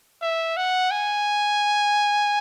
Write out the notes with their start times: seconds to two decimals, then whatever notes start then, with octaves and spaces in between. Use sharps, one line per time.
0.22 E5
0.57 F#5
0.91 G#5